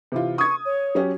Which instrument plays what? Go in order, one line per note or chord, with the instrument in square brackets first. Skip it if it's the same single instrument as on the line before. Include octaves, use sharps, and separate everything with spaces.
[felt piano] C3 E3 F4
[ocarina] C#6 [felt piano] D#6 G#6
[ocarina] C#5
[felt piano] F#3 C#4 G4